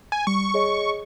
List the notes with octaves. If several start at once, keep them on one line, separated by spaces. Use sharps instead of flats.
G#5
G3 C#6
G#4 C#5 D#5